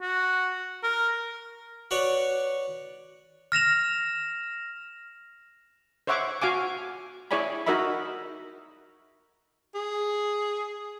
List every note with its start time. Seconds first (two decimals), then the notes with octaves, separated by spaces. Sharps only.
0.02 F#4
0.83 A#4
1.91 F#4 B4 C#5 D5
3.52 F6 A#6 E7 F7
6.07 C5 C#5 E5 F#5 C#6 D6
6.42 F#4 F5 G#5 D6
7.31 E4 G#4 C#5 D5 G#5 B5
7.66 D#4 F#4 A#4 D#5 E5 B5
9.74 G#4